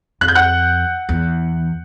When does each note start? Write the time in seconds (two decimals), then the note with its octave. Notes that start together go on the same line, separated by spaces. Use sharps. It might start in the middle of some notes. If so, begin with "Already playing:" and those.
0.21 F2 F#6
0.28 G6
0.35 F#5 F#6
1.09 E2